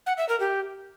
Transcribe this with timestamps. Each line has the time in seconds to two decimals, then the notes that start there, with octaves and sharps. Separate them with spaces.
0.06 F#5
0.18 E5
0.29 A#4
0.40 G4